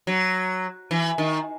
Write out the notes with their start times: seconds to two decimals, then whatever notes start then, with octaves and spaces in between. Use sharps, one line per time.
0.07 F#3
0.91 E3
1.18 D#3